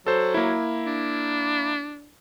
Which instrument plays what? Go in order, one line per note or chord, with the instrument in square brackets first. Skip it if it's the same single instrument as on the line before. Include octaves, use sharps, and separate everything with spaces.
[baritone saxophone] F#3 [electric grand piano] A4 C5
[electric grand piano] A#3 E4
[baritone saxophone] D4